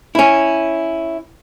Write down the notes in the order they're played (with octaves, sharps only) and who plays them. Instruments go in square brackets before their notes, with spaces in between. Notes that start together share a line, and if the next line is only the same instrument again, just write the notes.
[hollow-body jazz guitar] C#4 E4